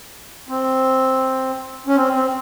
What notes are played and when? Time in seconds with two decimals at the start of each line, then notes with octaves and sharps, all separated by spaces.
0.49 C4
1.87 C#4
1.96 C4
2.14 C4